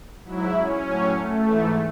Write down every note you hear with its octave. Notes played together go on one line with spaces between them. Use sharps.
G#2 F#3 E4
C#4
A2 F#3
A3
G#2 E3